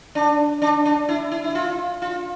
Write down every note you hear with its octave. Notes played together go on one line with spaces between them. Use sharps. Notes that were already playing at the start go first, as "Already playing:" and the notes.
D4
D4
D4
E4
E4
E4
F4
F4